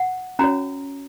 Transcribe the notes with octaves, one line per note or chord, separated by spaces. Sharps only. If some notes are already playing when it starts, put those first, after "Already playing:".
Already playing: F#5
C#4 F#4 C#5 A#5